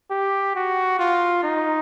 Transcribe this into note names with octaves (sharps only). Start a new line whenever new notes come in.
G4
F#4
F4
D#4